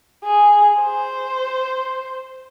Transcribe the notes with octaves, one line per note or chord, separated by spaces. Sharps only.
G#4
C5